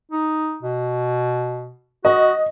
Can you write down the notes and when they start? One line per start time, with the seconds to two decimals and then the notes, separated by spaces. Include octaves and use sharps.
0.11 D#4
0.63 B2
2.05 F#4 D#5